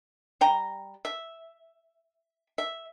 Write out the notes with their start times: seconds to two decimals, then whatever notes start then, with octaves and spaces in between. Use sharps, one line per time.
0.41 G3 G5 A#5
1.05 E5
2.58 E5